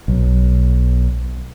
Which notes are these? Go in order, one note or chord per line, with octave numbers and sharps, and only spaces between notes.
B1